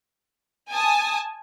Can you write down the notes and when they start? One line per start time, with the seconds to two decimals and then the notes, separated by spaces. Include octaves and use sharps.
0.71 G#5 A5 D#6